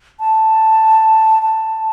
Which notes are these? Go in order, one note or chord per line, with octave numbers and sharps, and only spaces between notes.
A5
A5